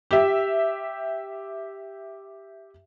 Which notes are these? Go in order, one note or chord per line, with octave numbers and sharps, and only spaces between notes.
G4 E5